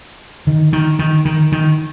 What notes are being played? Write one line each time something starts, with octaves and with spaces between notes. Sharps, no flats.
D#3
D#3
D#3
D#3
D#3